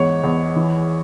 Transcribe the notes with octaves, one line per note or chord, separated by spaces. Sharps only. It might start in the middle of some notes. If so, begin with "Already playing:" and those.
Already playing: E2 G#2 C#5
E2
E3